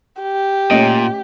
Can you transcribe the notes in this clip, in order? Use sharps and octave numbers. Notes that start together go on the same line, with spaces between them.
G4
A#2 A3 C#4 D#5